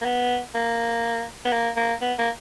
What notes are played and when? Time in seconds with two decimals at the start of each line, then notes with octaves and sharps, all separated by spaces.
0.01 A#3
0.05 B3
0.55 A#3
1.45 B3
1.52 A#3
1.76 A#3
2.01 B3
2.18 A#3